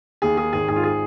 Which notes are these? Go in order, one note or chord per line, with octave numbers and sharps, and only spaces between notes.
D#2 G#4
D#3 G#4
G#1 G#4
G#2 G#4
F4
G#4